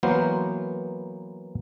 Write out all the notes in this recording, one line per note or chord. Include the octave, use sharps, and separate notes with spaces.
E3 F#3 A#3 B3 A#4 C5